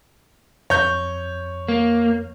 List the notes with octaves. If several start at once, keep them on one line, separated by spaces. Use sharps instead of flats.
F2 C#5 G6
A#3